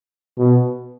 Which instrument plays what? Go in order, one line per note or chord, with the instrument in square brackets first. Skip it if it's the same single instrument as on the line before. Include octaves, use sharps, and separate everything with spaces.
[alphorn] B2